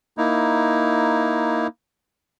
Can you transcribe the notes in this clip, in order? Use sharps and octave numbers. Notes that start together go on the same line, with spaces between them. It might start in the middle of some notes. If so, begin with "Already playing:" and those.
A#3 D#4 E4